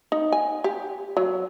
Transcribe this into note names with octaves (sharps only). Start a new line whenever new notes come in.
D#4
G#5
G4
F#3